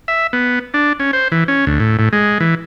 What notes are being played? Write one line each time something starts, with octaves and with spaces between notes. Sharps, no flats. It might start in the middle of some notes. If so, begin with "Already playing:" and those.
E5
B3
D4
C#4
C5
E3
C#4
D2
A2
A2
G#3
E3